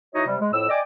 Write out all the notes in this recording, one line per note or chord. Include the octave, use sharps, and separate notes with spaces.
E3 D#4 F#4 C#5 D#5
C3 G3
G#3
F2 A2 E6
D5 D#5 G5 G#5 D6